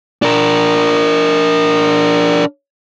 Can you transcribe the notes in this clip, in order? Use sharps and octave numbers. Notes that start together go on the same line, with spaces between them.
D4 A#4